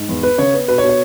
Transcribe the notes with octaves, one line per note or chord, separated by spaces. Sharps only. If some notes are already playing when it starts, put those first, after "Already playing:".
Already playing: G#2
E2
B3 B4
C#3 C#5
B3
B2 B4
C#5
B2
C#5